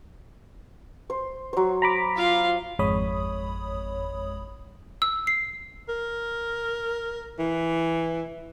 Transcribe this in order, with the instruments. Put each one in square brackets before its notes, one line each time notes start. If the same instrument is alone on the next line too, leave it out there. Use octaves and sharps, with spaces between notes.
[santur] C5
F#3 C5
[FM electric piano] A#5 B5 D6
[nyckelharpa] F4 F5
[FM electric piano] G#1 F2 G#3 C#5 B5 D#6
[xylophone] E6
C7
[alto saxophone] A#4
E3